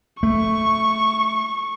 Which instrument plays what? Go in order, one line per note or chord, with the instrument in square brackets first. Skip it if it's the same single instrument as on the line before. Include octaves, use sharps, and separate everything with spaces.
[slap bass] A3 [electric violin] C#6